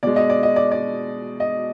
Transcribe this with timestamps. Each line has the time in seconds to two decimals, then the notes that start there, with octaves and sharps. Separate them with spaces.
0.03 B2 G#3 D5
0.16 D#5
0.30 D5
0.43 D#5
0.56 D5
0.71 D5
1.40 D#5